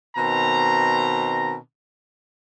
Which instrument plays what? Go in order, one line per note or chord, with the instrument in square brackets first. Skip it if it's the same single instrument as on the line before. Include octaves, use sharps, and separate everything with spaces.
[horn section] B2 D#3 C4 A#5